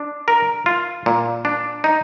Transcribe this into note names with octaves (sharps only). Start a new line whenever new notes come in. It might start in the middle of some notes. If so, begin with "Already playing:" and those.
Already playing: D4
A#4
F4
A#2
D4
D#4